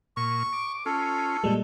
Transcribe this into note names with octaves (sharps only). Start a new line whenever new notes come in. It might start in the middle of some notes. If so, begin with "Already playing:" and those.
A#2 C#6
D6
C#4 F4 A4
A#2 G3 G#3